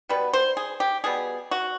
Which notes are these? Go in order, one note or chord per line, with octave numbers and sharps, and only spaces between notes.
B2 G3 B3 B4
C5
G#4
G4
B2 G3 B3 G#4
F#4